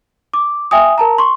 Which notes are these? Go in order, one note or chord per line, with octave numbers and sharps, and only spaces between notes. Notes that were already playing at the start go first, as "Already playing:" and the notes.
D6
E5 G5 G#5 D#6
A#4 A5 A#5
C6 C#6